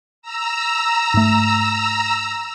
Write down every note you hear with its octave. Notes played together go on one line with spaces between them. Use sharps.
A#5 E6
G#2 A3